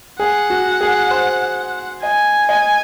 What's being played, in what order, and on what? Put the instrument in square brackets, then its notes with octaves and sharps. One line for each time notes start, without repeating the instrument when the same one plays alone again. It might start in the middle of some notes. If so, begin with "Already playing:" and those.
[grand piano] G#4 [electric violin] F#5
[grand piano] F#4
G#4
C5
[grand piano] D#5 [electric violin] G#5
[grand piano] D#5